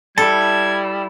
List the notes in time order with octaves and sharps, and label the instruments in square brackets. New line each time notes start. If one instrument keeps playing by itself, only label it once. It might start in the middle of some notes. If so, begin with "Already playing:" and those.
[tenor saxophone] G3 [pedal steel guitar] E4 A5 [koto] A4 [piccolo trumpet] G#6